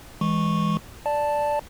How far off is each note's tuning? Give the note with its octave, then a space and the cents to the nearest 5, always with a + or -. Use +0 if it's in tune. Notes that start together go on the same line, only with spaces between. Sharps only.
E3 +0 G#3 -10 C#6 -10
D5 +0 A5 +0